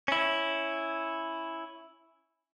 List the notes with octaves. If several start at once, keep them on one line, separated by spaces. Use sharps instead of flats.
C#4 E4